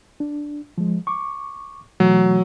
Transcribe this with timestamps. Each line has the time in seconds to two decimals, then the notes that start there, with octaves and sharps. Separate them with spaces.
0.20 D4
0.78 F3 G#3
1.07 C#6 D6
2.00 B2 E3 F#3 A3